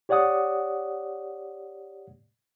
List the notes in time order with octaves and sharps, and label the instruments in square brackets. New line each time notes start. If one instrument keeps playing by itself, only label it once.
[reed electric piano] G4 C#5 D5 F#5 D#6